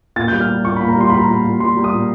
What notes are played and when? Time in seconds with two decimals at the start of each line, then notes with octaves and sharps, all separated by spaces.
0.16 A#2 A6
0.28 G6
0.32 G3
0.41 F6
0.48 G3
0.64 A#2 C#6
0.76 B5
0.81 A#2
0.88 A#5
0.96 G3 C6
1.10 G3 B5
1.19 A#5
1.28 A#2 B5
1.44 A#2
1.60 G3 C6
1.76 G3
1.84 D#6
1.92 A#2